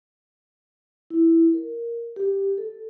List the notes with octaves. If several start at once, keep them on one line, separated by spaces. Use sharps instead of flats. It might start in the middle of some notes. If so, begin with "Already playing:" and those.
E4
A#4
G4
A4